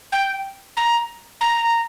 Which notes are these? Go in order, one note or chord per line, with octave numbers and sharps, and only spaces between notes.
G5
A#5
A#5